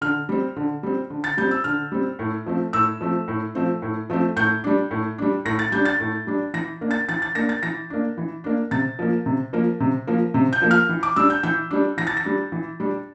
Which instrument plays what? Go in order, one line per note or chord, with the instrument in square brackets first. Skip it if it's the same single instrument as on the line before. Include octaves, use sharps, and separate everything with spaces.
[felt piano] D3 F6
G3 C4
D3
G3 C4
D3
A6
G3 C4 G6
E6
D3 F6
G3 C4
A2
F3 A3 C4
A2 E6
F3 A3 C4
A2
F3 A3 C4
A2
F3 A3 C4
A2 G6
G3 D4
A2
G3 D4
A2 A#6
A6
G3 D4 G6
A6
A2
G3 D4
E3 A#6
A#3 D4
A6
E3 A6
A6
A#3 D4 A#6
A6
E3 A#6
A#3 D4
E3
A#3 D4
C3 A6
F3 A#3
C3
F3 A#3
C3
F3 A#3
C3
G6
F3 A#3
F6
E3
D6
G3 D4 E6
G6
E3 G6
G3 D4
E3 A#6
A6
A#6
G3 D4
E3
G3 D4